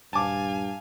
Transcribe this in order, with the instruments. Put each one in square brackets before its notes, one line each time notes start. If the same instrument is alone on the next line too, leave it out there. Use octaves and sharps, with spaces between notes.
[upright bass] D#1 [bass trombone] G2 [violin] F5 G#5 [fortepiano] A5 D6